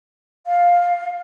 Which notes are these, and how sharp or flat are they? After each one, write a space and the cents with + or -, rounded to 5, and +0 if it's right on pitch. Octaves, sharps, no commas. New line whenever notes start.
F5 +5